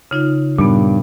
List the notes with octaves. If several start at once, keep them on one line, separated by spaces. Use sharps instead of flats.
C#3 D#4 F4
G2 A#2 B3